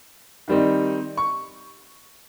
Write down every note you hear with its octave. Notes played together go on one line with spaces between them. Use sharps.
D#3 G3 C4 D#4
C#6